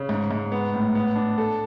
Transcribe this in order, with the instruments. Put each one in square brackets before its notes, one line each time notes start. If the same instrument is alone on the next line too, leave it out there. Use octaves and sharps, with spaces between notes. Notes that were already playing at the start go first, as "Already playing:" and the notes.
Already playing: [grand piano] C#3
G#2
G#2
B3
A2
B3
D4
A4